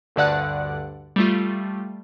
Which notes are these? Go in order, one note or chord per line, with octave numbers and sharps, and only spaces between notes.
D2 G2 D3 D5 F#5 F#6
G3 A3 F4